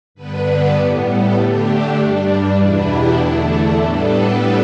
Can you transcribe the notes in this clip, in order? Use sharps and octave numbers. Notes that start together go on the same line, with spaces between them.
G2 D3 B3 D4 B4
A2 G3 B3
A4
D3 A3 D4 G4
G2 G3 D4
D4
E2 B2 B3 D4 E4
G4
E2 D3 A3 D4 E4
E4
A2 G3 B3 D4 A4
B4